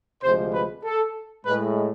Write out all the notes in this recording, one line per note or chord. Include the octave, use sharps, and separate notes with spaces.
D2 C3 F3 G#3 C5
B4
A4
A2 G#3 B4